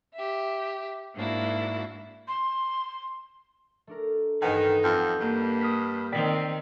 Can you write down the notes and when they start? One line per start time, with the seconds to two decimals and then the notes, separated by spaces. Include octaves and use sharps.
0.14 G4 E5
1.15 G#2 A#3 D4 E4 F#4
2.28 C6
3.87 A3 D4 A#4
4.42 A1 G2 D#3 D#4 B4 F#5 G#5
4.84 F2 F#5 G6
5.20 G2 A#3 A#5
5.61 D#6 F6 B6
6.12 D#3 C4 D5 G5 B6